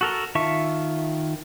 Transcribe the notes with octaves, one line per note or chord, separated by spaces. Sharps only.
F#4 A4 A#4
D#3 F4 E5 A5 C#6